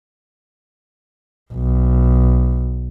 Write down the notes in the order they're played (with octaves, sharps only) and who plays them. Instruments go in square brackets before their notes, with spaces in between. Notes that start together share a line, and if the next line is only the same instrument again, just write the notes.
[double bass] B1